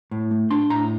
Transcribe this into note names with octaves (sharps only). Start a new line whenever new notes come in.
A2
A3
D4 C6
A2 A#5